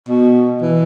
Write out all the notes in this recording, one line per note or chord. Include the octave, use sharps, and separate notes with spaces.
B2
E3